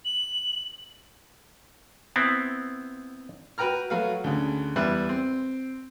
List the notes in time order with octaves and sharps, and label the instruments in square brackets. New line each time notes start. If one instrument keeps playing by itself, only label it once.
[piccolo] F#7
[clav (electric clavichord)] B3 C4 E4
[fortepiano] F#4 B4 G5 A#5 F6
F#3 A3 F#4 B4 F5
D2 C#3
E2 E3 G3 B4 E5 F#6
C4